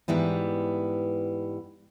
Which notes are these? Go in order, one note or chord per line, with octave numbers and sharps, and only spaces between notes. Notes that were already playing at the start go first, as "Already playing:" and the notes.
G#2 E3 G3 B3